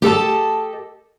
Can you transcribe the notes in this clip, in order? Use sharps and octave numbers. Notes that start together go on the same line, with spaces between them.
G4 A4 D#5 A5